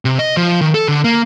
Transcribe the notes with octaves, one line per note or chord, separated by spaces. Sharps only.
C3
D#5
F3
D#3
A4
D3
A#3